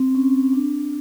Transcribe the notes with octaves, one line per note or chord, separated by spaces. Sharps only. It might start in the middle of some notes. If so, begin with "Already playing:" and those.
Already playing: C4
C#4
D4